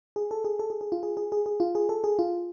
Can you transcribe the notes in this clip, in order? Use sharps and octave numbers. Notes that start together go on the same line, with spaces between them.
G#4
A4
G#4
A4
G#4
G#4
F4
G#4
G#4
G#4
G#4
F4
G#4
A4
G#4
F4